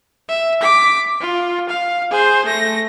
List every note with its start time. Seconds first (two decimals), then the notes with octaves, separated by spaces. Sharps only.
0.29 E5
0.61 D6 B6
1.20 F4
1.69 F5
2.10 G#4 C5
2.45 A3 A#6